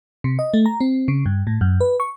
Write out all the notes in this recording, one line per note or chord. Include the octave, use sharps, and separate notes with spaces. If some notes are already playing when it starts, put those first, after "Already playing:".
C3
D#5
A3
A#5
C4
C#3
G2
A2
F#2
B4
C#6